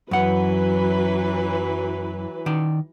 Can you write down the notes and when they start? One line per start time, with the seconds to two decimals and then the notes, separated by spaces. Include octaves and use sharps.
0.11 F#2 E3 F#3 B4 F#5
2.46 D#3 D5